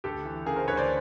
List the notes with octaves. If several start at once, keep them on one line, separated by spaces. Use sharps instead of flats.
D2 G4 A4
E3
C#3 G#4 A#4
A#4 C5
D2 B4 C#5
C5 D5